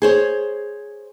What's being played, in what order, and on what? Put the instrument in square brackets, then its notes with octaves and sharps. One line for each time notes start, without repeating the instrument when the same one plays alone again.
[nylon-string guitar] G#4 C5 C#5